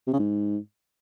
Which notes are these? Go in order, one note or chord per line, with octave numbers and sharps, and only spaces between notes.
C3
C#3
G#2